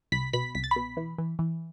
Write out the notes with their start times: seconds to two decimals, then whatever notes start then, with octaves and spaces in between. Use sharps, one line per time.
0.12 C2 B5 B6
0.33 B2 B5 B6
0.55 C2 B6
0.64 A6
0.71 B5 B6
0.76 B2
0.97 E3
1.18 E3
1.39 E3